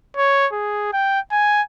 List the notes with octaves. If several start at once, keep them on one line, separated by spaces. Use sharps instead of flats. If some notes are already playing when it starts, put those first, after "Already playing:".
C#5
G#4
G5
G#5